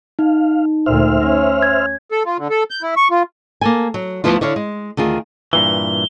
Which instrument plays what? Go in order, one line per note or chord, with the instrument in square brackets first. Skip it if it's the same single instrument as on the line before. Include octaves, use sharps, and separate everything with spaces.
[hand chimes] D#4 [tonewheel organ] F5
[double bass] D2 A#2 [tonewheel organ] C5 E5 F6
[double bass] C#4
[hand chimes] G#6
[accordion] A4
F4
D3
A4
G6
E4
C#6
F4
[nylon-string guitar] A#3 A4 G#5
F#3
D2 G2 F3 B3 E4 F4
D3 E4 C#5 F5
G#3
D2 D#3 F4 G#4
[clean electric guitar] G2 A#2 E3 [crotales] G7